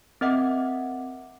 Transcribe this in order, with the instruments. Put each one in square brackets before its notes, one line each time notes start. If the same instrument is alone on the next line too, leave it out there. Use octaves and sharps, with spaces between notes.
[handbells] C4 A#4 D#5 E5 F#5 D6